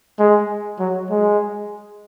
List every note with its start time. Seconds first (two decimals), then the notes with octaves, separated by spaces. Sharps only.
0.19 G#3
0.80 F#3
1.10 G#3